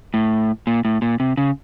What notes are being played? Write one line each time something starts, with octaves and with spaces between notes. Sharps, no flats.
A2
A#2
A2
A#2
C3
C#3